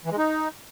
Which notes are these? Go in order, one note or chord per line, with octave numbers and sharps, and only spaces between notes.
E3
G#3
D#4